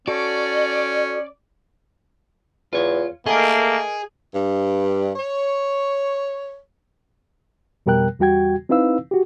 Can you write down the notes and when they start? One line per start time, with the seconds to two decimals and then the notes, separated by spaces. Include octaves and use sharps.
0.08 C#4 F#4 A4 D5
2.73 E2 F4 C#5
3.26 A3 A#3 G#4 A#4 D#5
4.33 G2
5.15 C#5
7.86 F2 B2 G3 A#4 G5 F#6
8.19 E2 G3 F#4 G5 G#6
8.69 C4 D#4 E4 B4 F5 E6
9.11 F#4 G4